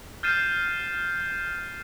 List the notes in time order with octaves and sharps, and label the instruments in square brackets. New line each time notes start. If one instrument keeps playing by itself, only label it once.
[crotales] F6 G6 A6 C7 D#7 E7